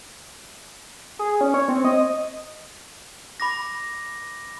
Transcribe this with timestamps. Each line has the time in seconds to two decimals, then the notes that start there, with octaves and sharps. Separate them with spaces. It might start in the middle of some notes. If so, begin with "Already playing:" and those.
1.19 G#4
1.41 C#4
1.54 C#5
1.68 C4
1.85 D#5
3.40 B5 D6 A#6